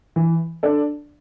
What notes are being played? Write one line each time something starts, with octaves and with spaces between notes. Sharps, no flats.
E3
D4 A4 D5